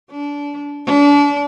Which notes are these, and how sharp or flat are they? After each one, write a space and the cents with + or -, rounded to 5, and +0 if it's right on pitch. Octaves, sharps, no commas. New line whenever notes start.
D4 -25
D4 -35